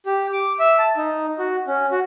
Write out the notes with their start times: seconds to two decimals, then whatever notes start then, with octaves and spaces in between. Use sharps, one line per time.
0.06 G4
0.33 D6
0.59 E5
0.78 A5
0.97 D#4
1.39 F#4
1.68 C#4
1.92 F#4